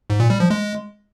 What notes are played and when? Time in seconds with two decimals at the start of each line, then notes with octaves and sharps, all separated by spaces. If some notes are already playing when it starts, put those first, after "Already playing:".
0.10 G#2
0.20 A#2
0.30 G3
0.40 F3
0.50 G#3